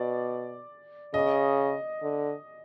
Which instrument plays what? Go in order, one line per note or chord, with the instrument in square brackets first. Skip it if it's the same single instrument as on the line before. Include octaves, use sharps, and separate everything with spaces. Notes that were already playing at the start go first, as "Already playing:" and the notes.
Already playing: [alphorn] B2 [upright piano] D5
[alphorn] C#3 [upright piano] D#5
[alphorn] D3